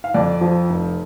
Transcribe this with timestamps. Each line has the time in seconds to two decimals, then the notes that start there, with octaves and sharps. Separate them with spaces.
0.04 F5
0.14 F2 D5
0.41 F3
0.70 F1